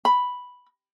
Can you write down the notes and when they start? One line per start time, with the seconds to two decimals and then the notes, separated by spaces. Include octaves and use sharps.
0.05 B5